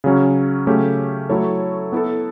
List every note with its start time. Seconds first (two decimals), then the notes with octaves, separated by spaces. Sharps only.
0.04 C#3 F#3 C#4
0.67 C#3 F#3 A3 C#4 G4
1.29 F#3 A3 E4 A4 C#5
1.92 B3 E4 A4